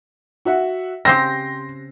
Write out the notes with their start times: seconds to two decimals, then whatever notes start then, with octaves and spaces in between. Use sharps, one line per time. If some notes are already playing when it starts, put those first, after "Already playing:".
0.45 F#4 E5 F#5
1.05 C#3 C4 G4 G5 C6 A#6 C7